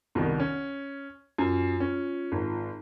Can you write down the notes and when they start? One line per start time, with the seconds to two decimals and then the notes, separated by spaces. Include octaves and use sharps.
0.15 C2 B2 D#3
0.40 C#4
1.38 F#2 F4
1.80 C#4
2.32 G#1